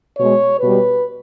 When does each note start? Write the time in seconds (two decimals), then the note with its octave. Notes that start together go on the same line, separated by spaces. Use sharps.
0.17 B2 G#3 C#5
0.60 B2 B4
0.66 G3